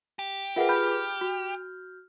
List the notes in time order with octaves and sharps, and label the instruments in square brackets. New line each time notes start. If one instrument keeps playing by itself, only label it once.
[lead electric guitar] G4
[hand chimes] F4 G#4 B4 [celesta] A#4 E5 F#5
[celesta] B5 [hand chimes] F6 G6
[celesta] F#4